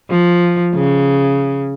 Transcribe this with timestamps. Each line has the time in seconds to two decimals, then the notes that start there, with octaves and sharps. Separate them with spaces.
0.10 F3
0.75 C#3